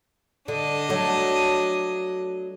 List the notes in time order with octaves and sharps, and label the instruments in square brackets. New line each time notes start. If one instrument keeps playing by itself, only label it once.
[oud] D3 [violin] D4 D#5
[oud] F#3 A3